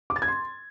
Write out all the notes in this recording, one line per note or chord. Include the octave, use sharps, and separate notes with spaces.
D6
A6
G#6
C6